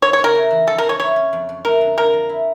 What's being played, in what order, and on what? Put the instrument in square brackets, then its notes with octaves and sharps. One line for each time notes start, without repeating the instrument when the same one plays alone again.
[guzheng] C#3 [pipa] C#5
[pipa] C#5
[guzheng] C#3
[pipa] A#4
[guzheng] A3
E3
[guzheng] F3 [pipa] A4
[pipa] A#4
[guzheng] F3
[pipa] C#5
[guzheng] E4 [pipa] C#5
[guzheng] C#4
F2
F2
[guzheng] A3 [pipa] A#4
[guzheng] D3
[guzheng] F3 [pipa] A#4
[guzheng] F3
E4